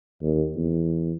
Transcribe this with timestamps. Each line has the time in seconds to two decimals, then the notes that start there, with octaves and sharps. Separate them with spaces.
0.22 D#2
0.56 E2